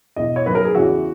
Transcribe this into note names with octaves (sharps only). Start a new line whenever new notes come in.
E2 B2 D#5
C#5
F#2 D#3 B4
A#4
G#4
E2 C#3 E3 F#4